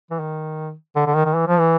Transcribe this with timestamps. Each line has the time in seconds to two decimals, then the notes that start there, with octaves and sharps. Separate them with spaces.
0.11 E3
0.19 D#3
0.96 D3
1.06 D3
1.15 D#3
1.25 D#3
1.34 E3
1.47 F3
1.59 E3